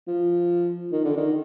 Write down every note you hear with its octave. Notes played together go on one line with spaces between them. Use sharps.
F3
D#3
D3
D#3